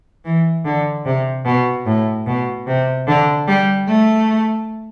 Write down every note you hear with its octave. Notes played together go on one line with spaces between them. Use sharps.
E3
D3
C3
B2
A2
B2
C3
D3
G3
A3